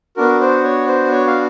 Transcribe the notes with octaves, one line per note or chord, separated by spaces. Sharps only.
B3 D4 F#4 A#4
C5
C#5
C5
C#5
F5